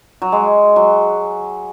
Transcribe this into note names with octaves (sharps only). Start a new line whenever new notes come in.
F#3
G#3
F#3